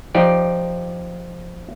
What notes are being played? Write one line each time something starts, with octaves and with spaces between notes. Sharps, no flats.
F3 D#4 G4 D5